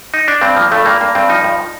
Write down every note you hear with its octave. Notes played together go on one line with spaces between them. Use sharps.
D#4
D4
G2 C4
F3 A#3
G2 A3
G2 A#3
G2 A#3
G2 C4
F3 D#4
G2